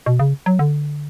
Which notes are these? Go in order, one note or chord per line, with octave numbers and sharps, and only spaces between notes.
B2
C#3
F#3
D3